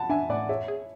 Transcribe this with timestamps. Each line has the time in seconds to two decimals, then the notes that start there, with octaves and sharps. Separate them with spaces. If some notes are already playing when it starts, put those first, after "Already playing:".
Already playing: F#5 A5 B5
0.09 D4 E5 G#5
0.29 A2 D5 F#5
0.49 G#4 C#5 E5
0.68 G#4